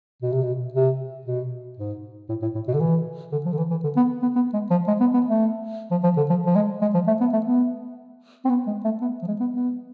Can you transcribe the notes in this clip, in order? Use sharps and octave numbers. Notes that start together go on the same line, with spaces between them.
B2
C3
B2
C3
B2
G#2
A2
A2
A2
B2
D3
E3
D3
F3
D3
E3
E3
D3
B3
B3
B3
G#3
F3
G#3
B3
B3
A3
F3
F3
D3
F3
F3
G#3
G#3
F3
A3
B3
A3
B3
C4
B3
G#3
A3
B3
F3
G#3
B3
B3